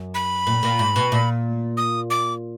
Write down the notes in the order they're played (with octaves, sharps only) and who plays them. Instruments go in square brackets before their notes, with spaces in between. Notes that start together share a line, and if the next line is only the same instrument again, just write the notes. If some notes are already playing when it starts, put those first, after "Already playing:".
Already playing: [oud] F#2
[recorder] B5
[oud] A#2
A#2
G#2
B2
A#2
[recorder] D#6
D6